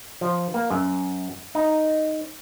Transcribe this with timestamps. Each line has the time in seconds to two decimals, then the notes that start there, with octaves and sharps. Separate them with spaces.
0.21 F3
0.54 A#3
0.70 F#2
1.55 D#4